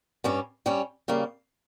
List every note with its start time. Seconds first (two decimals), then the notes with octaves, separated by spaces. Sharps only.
0.24 G2 G3 C#4
0.66 G2 G3 C#4
1.08 C#3 G3 A#3